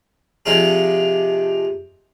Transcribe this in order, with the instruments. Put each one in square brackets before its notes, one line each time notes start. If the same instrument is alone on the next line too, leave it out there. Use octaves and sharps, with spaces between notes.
[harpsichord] C3 F3 D4 D#4 F4 G#4